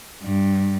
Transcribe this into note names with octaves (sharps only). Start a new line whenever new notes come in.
G2